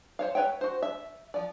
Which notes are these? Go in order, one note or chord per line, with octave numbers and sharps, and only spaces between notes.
C5 C#5 F5
B4 C#5 E5 G5
F#4 C5
E5
F3 D5